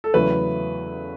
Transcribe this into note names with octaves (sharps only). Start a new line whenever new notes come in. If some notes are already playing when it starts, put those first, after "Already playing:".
A4
E2 C#3 F#3 A3 E4 B4